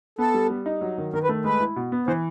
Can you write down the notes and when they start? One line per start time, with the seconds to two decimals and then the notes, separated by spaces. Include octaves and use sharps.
0.18 B3 A4
0.34 G3
0.50 G3
0.66 D#4
0.81 F#3
0.98 D#3
1.13 D#3 A#4
1.24 B4
1.29 A3
1.44 G#3 B4
1.60 E4
1.76 B2
1.92 B3
2.07 E3 C5